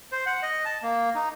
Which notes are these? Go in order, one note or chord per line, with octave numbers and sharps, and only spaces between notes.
C5
F#5
D#5
A5
A#3
D#4